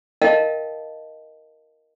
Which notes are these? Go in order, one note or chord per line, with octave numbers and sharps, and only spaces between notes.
A#4 D#5 F5 G5 A5